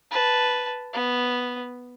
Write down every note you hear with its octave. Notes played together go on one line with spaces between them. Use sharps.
B4 A5
B3